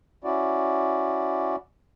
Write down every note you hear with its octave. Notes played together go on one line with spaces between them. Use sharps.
C#4 E4 F#4 D5